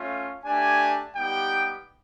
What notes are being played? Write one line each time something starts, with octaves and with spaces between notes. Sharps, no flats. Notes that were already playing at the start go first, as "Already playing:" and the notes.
Already playing: A3 C#4 F4
A3 D4 G4 G#5
G3 B3 D#4 G4 G5